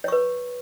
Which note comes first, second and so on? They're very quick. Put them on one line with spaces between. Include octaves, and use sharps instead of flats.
C#5 C#6 B4